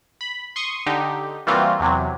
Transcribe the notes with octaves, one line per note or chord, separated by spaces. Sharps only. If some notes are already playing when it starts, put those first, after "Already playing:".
B5
C6 C#6 D#6
D3 D#4 G4
E3 G3 A#3 C4 F4 F#4
E2 C3 F#3